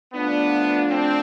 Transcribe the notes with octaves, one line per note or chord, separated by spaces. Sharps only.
F3 A3 B3 D4 F4
C4